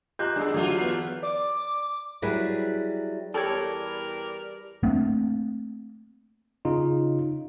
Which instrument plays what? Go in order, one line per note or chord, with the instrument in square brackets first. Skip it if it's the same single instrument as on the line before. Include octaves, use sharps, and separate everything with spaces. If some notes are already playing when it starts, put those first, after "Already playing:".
[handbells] F4 G4 D#5 [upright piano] A#5 F#6 G6
[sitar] G#3 B3 [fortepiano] D4 G#4
[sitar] E2 A3 F4 [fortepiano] D3 [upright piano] F#3 [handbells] G4
[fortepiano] B3
[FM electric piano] D5 [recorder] D6
[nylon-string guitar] F#3 G3 E4 G#4 B4
[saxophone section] E2 A#4 D5 [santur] G3 [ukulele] A4 C#5
[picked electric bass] A3 A#3 C4 D4
[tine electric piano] C#3 D#4 F4